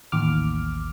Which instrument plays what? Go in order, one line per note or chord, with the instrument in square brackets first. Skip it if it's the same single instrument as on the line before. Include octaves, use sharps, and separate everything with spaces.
[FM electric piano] A1 D#2 D6 F6